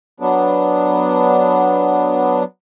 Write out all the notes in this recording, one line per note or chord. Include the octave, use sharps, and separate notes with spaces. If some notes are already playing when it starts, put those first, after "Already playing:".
F#3 B3 D4